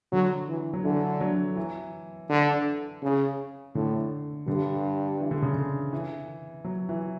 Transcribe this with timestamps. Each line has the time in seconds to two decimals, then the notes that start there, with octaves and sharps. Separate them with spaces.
0.12 D3 F#3
0.49 E3
0.73 F#3
0.84 D3 E3
1.21 F#3
1.57 E3
2.30 D3
3.02 C#3
3.75 A2 D3
4.47 G2 D3
5.20 E3
5.31 D3
5.42 C#3
5.55 D3
5.93 E3
6.65 F#3
6.89 E3